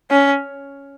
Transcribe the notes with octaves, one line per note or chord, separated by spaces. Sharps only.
C#4